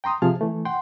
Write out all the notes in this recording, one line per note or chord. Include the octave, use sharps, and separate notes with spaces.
G5 A#5 C6 D#6
C3 F3 G#4 A5 F6
E3 A3
F#5 G5 C6